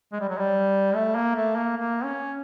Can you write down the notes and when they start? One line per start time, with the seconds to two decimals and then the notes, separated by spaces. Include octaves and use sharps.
0.12 G#3
0.21 G3
0.29 F#3
0.38 G3
0.95 A3
1.15 A#3
1.35 A3
1.56 A#3
1.77 A#3
2.04 C#4